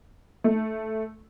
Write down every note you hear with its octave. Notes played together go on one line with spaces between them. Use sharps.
A3